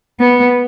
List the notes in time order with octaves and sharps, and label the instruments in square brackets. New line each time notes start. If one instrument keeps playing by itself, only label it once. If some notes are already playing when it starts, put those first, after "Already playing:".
[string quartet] B3